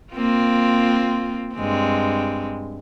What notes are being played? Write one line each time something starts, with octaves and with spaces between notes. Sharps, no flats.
A#3 C4 F4
G2 G#3 C4